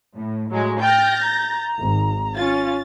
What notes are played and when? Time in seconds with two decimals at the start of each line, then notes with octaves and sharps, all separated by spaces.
0.16 A2
0.49 A2 F#3 G#3
0.81 G5 F6 G6 A6 A#6
1.24 A#5
1.78 G#1
2.36 C#4 F4 A6